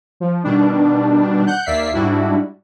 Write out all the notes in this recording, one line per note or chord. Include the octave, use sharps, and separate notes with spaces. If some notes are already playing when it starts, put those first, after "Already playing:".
F3
B2 D#3 G3 D4
F#5 F#6 G6
D#2 A#3 D5 E5 B6 C7
G#2 G3 D4 E4 F#4